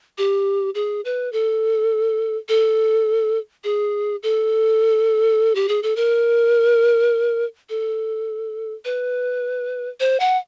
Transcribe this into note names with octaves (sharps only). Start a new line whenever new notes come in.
G4
G#4
B4
A4
A4
G#4
A4
G4
G#4
A4
A#4
A4
B4
C5
F#5